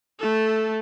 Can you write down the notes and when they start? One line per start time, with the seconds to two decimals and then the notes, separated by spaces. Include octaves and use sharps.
0.19 A3 A4